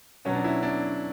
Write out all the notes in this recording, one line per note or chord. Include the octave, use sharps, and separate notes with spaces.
B2 F#3 B3 C#4
D4
E4
D4